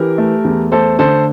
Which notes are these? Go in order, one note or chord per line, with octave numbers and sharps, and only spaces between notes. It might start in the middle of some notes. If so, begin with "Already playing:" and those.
Already playing: E3 G4 A#4
A3
E2
A3 A4 C5
D3 A4 C5